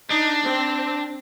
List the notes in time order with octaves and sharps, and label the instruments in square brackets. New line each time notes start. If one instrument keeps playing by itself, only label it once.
[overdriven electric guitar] D4 [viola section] D#4
[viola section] C4